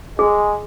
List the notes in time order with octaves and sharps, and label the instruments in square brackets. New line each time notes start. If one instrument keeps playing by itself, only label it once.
[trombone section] G#3 [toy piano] G#4